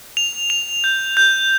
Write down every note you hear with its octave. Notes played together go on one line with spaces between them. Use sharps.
F7
F7
G6
G6